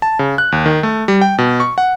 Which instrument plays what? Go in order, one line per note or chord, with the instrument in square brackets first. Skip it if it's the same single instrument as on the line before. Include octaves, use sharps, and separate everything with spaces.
[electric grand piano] A5
C#3
F#6
D#2
D#3
A3
G3
G5
B2
C#6
F#5